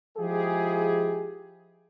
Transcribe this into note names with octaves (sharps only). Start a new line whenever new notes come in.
F3 G#3 E4 F4 G4 G#4